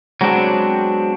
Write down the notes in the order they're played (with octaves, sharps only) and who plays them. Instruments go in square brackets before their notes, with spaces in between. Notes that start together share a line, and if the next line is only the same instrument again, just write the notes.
[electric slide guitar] F#3 G#3 B3 C4 D4 F#4